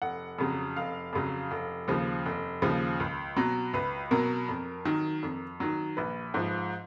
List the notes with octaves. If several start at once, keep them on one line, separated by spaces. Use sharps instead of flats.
F1 F#5
F2 C#3 F#3
F1 F5
F2 C#3 F#3
F1
D#2 C#3 F3
F1
D#2 C#3 F3
C#2
B2 F#3
C#2 B4
B2 F#3 A#4
F2
D#3 F#3
F2
D#3 F#3
A#1 B4
G#2 F3